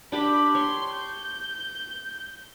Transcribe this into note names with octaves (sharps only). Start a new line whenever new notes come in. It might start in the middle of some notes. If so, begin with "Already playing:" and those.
D4 G4 G5 B5
C#5 C6
G6